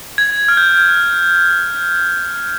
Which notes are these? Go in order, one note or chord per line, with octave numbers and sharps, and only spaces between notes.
G#6
F6
G6